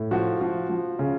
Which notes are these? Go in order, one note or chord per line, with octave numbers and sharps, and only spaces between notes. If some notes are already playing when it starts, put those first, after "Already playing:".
Already playing: A2
F3 F#4
F3
F3
C#3